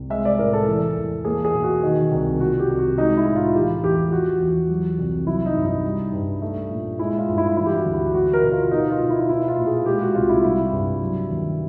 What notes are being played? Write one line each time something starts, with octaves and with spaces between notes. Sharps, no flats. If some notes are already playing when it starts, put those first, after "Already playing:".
Already playing: C2
G#3 E5
D5
A2 A#4
A4
E3
E2
A#3 G#4
G#4
B2
F#4
D#3
C2
F3 F#4
G4
C2
F#4
G#3 D#4
E4
A2
F4
E3 G4
E2 G4
F3 F#4
E2
F#3
C2
F#3 E4
D#4
G2
D#4
G3
G2
A3
A#2
G#3 E4
F4
G2
E4
E3 E4
G4
F#4
D2
F#4
B3 F#4
A#4
B2
F4
B3 D#4
F4
B2
E4
B3 E4
F4
A#2
G#4
G#3 G4
F#4
C2 F4
E4
G3 E4
G2
F#3
D#2